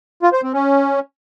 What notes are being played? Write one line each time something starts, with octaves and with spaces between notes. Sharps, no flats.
F4
C5
C4
C#4